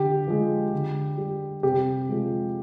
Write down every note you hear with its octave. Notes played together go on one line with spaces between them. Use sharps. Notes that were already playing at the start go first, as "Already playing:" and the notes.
Already playing: D3 G4
F3 G#3
D3
G3
C3 G4
F3 G#3